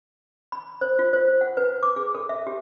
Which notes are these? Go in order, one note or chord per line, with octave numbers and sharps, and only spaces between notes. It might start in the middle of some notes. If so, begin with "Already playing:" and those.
B5
C5
F4
C5
F#5
B4
D6
G#4
A4
E5
G4